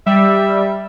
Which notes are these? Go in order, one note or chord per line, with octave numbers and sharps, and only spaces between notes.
G3 E5